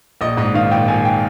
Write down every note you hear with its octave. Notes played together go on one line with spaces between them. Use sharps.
A#1 D#5
G#2 D#5
D#3 F5
A#1 G5
A#1 G#5
G5